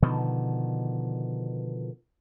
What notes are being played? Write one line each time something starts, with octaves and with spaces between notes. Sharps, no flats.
B2 D3 D#3 F3